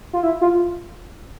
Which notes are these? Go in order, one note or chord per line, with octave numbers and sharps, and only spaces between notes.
F4
E4
F4